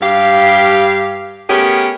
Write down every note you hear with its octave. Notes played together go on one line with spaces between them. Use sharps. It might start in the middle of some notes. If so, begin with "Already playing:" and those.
G2 G4 F5
A3 B3 C#4 G4 G#4 A#4